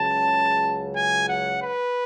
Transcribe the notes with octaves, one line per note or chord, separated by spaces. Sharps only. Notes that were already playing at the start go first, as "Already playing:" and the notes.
Already playing: C#2 C#3 F#3 A5
G#5
F#5
B4